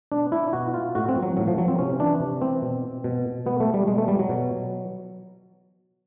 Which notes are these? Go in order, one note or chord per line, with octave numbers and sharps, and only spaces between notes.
B2 D4
E4
B2 F#4
F4
A2 F#4
C4
F3
F#3
A2 F#3
F3
F3 F#3
C4
C3 C#4
E3 D4
C3
E3 C4
B2
B2
B2 B3
A3
G3
B2 G#3
A3
G3
F#3
B2